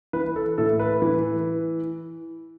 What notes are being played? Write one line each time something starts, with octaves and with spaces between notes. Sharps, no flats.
E3 B4
A4
A2 A4
B4
E3